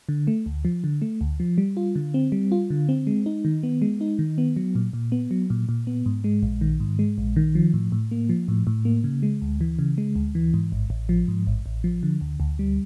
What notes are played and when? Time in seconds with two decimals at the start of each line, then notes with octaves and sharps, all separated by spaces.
0.09 D3
0.27 A3
0.46 D2
0.65 F3
0.84 D3
1.02 A3
1.21 D2
1.40 F3
1.58 G3
1.77 F4
1.96 D3
2.14 C4
2.32 G3
2.52 F4
2.70 D3
2.89 C4
3.07 G#3
3.26 D#4
3.45 D#3
3.63 B3
3.82 G#3
4.01 D#4
4.19 D#3
4.38 B3
4.56 F#3
4.75 A#2
4.93 A#2
5.12 B3
5.31 F#3
5.50 A#2
5.69 A#2
5.87 B3
6.06 G#2
6.24 G#3
6.43 A#1
6.61 D#3
6.80 G#2
6.99 G#3
7.18 A#1
7.36 D#3
7.55 F3
7.74 A2
7.92 A2
8.11 A#3
8.29 F3
8.48 A2
8.67 A2
8.85 A#3
9.04 C#3
9.23 G#3
9.42 D2
9.61 E3
9.79 C#3
9.98 G#3
10.16 D2
10.35 E3
10.54 G#2
10.72 A1
10.90 A1
11.09 F3
11.28 G#2
11.47 A1
11.66 A1
11.84 F3
12.03 D3
12.21 D2
12.40 D2
12.59 G3